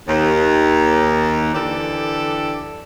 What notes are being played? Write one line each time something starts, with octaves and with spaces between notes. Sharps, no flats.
D#2
D3 E3 G4 A4 D5